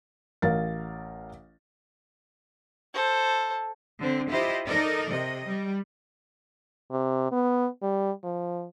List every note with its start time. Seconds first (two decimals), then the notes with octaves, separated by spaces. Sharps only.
0.42 A1 A#4 F5 A6
2.94 A4 C5
3.98 D3 C4
4.30 E4 F4 G4 C5 D#5
4.65 D#4 A4 A#4 D5 D#5
5.09 C3 D#5
5.46 G3
6.91 C3
7.32 B3
7.82 G3
8.24 F3